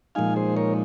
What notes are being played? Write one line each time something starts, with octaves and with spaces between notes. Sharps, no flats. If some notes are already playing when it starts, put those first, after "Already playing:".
A#2 F3 G#3 D#4 F5 G#5
G#4 C5
A#4 C#5